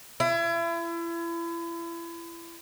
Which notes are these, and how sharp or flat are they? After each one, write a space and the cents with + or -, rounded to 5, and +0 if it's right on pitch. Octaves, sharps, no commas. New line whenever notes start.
E4 +35